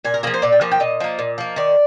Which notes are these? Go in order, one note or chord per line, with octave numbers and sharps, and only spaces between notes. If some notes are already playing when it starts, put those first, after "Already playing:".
A#2 G#5
A#4
F3 A#3 G#4
C5
A#2 D5
G5
F3 A#3 G#5
G5
A#2 D#5
F3 A#3
A#2
F3 A#3
D#3 D5